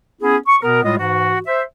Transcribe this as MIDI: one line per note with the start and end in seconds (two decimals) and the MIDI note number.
0.21 0.37 59
0.21 0.37 61
0.21 0.37 64
0.21 0.37 68
0.47 0.57 85
0.61 0.83 47
0.61 0.83 59
0.61 0.83 70
0.84 0.96 45
0.84 0.96 55
0.84 0.96 56
0.84 0.96 65
0.84 0.96 75
0.99 1.39 44
0.99 1.39 52
0.99 1.39 66
1.46 1.63 72
1.46 1.63 76